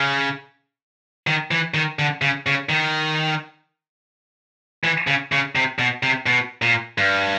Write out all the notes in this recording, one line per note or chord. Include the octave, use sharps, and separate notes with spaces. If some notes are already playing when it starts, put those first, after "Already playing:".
Already playing: C#3
D#3
E3
D#3
D3
C#3
C#3
D#3
E3
C#3
C#3
C3
B2
C3
B2
A#2
G2